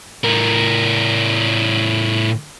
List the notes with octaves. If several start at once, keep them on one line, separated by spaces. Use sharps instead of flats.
A2 A#4